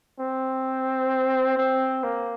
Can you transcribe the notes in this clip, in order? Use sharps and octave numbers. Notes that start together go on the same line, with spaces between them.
C4
C4
A#3